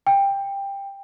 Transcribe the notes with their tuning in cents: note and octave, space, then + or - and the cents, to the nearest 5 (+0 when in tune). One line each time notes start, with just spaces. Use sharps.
G5 +15